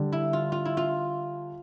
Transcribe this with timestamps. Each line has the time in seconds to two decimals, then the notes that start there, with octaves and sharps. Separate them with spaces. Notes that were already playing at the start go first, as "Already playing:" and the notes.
Already playing: D3 G3 D4
0.12 E4
0.33 F4
0.52 F4
0.65 E4
0.77 F4